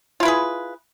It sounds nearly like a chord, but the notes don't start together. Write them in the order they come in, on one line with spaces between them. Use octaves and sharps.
F4 E4 B4 G#4